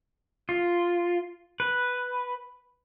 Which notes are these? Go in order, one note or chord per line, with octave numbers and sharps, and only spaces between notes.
F4
B4